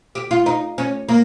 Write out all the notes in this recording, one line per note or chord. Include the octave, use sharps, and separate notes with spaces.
G4
F4
D#4
C#4
A#3